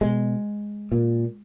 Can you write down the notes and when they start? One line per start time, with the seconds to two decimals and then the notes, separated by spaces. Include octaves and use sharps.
0.01 B2 G#3
0.92 A#2